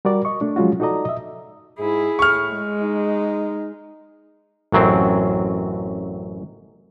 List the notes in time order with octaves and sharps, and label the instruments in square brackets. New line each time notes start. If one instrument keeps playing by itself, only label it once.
[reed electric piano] G3 F#4 A#4 D5
D#5 C#6
A3 D4
F3 F#3 G#3 C#4 F4 F#4
D#4 F#4 A4 D5 D#5 A#5
D#5 E5
[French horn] G#2 [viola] E4 G#4
[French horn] A2 [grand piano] C#6 F6
[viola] G#3
[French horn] D#4
[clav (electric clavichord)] A1 F#2 F#3 C4